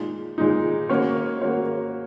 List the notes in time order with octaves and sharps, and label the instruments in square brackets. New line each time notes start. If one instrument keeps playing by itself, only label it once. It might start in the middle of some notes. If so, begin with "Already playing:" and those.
Already playing: [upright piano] A#2 G#3 D#4
A#2 G#3 D#4
A#3 C#4 F#4 A#4 C#5
A#3 C#4 F#4 A#4 C#5